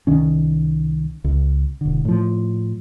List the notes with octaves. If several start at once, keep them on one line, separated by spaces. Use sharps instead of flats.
C2 D#3 C#4
C#2
E1 D3
A2 F3